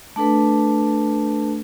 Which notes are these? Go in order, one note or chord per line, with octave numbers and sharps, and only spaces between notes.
A3 D4 A4 B4